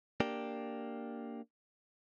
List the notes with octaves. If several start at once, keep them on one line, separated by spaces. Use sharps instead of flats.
A#3 D4 G4